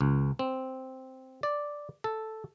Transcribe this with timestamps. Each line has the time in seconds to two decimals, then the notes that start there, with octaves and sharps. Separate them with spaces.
0.01 C#2
0.39 C4
1.43 D5
2.04 A4